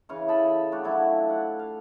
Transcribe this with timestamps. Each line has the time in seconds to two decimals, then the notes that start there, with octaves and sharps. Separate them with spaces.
0.09 C#3 E3 F5 C#6
0.28 A4 D#5 A5 B5
0.72 A3 D4 F#4 G4
0.84 F3 F#3 E4
1.29 F5 F#5
1.59 F5